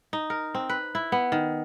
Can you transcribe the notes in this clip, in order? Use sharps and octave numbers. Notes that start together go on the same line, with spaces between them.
D#4
A#4
C4
B4
E4
B3
D#3